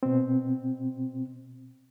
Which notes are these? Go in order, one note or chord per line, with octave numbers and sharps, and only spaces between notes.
B2 C4